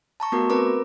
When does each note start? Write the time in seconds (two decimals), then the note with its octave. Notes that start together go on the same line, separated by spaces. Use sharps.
0.20 A5 A#5 C#6
0.32 A3 B3 F#4 A#4
0.50 C4 A#4 B4 A#5 D6